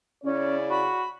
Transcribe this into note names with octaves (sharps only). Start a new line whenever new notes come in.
C#3 C#4 E4 D5
F#4 B5